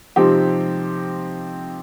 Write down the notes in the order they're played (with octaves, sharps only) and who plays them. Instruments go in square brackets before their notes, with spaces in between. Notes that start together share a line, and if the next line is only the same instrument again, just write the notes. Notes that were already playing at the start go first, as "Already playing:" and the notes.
[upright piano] C3 F3 C4 D#4 G4